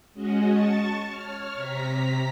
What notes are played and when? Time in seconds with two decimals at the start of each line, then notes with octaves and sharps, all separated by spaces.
0.13 G#3 C#4 F#4 D#5
0.52 A5 C#6 A6
1.06 C#5 F6
1.54 C3 A#5 B6